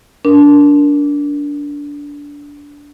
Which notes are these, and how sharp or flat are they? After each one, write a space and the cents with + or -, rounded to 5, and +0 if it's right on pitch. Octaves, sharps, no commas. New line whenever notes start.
D4 -20 A#4 +10